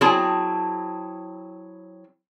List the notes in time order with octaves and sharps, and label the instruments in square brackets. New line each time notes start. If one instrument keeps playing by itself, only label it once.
[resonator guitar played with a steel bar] F#3 C4 E4 G#4 A5